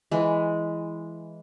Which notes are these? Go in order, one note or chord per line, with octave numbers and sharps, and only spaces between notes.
E3 G#3